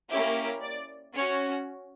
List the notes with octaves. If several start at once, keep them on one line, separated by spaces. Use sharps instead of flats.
A#3 C#4 E4 G4 E5
D5
C#4 F#4 C#5